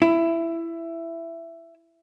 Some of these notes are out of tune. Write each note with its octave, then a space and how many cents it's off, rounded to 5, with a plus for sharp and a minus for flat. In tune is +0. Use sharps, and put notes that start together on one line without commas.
E4 +15